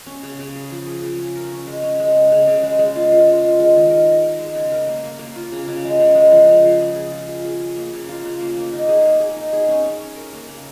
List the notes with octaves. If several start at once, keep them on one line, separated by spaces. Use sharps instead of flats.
C#4
C#3
C#3
G#4
F3
G#4
C#3
C#4
A#4
C#4
G#3
C#4
G#3
C#3
C#3
C#3
G#3
G#3
F4
F4
G#3
F4
G#3
D#3
A#4
A#4
A#4
G#3
C#3
A#4
A#3
A#3
A#3
F4
C#3
C#3
G#3
C#3
G#3
F3
C#3
F3
G#4
G#4
F4
G#4
G#4
G#4
A#3
C#3
F4
C#3
A#3
A#3
D#4
G#4
A#3
G#4
D#4
G#4
C#4
C#4
C#4
A#4
A#3
C#3